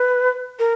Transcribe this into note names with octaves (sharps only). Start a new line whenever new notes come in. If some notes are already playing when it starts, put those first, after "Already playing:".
Already playing: B4
A#4